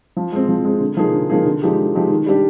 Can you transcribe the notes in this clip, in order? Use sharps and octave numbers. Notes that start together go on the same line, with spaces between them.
F3
G#3 C4
F3
G#3 C4
D3
F3 A#3 D#4 G#4
D3
F3 A#3 D#4 G#4
D3
F3 G#3 D#4 G4
D3
F3 G#3 D#4 G4
D#3
G3 D4 G4